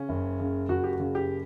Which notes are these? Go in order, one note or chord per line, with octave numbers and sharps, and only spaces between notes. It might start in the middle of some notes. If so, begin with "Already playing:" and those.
Already playing: C#3 C#4
F#1
C#3
F#1 F#4
G4
F#4
C#3
G4